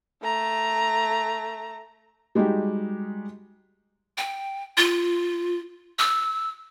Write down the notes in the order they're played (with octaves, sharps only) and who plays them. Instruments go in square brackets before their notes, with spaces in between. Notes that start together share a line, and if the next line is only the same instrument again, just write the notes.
[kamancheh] A3 A#5
[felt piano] G3 G#3 D#4 F#4 G4
[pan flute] G5
F4
E6